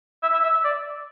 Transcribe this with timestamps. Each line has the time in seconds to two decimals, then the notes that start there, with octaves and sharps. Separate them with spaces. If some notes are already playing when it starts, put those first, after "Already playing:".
0.23 E5
0.33 E5
0.43 E5
0.54 E5
0.64 D5